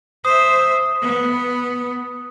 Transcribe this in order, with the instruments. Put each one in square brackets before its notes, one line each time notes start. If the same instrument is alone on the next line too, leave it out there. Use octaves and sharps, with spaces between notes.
[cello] C5 E5 [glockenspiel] D#6
[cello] B3